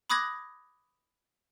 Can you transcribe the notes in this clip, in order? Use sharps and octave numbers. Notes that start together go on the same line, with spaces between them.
B5 D6 D#6 F#6 G#6 A#6